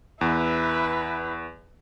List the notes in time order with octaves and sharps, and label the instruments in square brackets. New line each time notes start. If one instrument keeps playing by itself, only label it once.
[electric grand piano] E2 [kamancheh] E4 B4